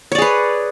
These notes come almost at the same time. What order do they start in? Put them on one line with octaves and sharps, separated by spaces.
C#5 D5 G#4 B4